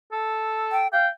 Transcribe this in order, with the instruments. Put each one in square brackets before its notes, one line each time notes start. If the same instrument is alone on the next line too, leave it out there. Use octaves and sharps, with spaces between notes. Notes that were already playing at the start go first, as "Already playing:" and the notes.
[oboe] A4
[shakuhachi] G5
[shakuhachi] F5 [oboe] G5